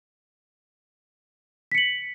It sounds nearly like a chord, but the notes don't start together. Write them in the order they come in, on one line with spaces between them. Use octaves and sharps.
B6 C#7 F#7